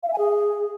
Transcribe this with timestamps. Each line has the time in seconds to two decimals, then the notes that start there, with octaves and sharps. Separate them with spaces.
0.03 F5
0.08 E5
0.13 G#5
0.18 G#4